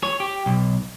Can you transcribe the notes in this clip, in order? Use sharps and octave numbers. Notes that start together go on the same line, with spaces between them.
C#5
G4
B1